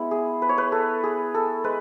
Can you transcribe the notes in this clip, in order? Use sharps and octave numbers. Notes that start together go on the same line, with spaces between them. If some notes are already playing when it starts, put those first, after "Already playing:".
Already playing: G#3 B3 E4
G#4
B4
C#5
B4
A4
G#4
A4
G#3 B4